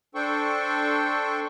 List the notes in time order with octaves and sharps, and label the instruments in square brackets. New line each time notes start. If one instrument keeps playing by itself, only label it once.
[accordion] D4 A4 C5 G5 C#6